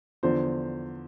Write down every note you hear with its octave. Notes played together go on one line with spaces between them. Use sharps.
E2 D3 F3 C5